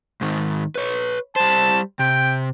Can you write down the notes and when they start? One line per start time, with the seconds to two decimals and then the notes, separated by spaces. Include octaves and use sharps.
0.21 G#2 D#3
0.75 B4 C#5
1.36 G3 C5 A5
1.99 C3 G5